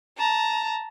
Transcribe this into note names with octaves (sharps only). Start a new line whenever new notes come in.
A5 A#5